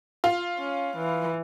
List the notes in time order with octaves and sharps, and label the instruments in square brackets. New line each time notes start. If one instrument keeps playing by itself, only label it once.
[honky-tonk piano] F4
[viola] C#4
E3